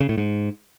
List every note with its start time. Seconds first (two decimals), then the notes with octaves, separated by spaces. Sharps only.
0.01 C#3
0.09 A2
0.18 G#2